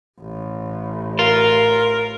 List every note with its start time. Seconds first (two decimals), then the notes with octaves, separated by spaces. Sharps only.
0.20 A1
1.19 F4 A#4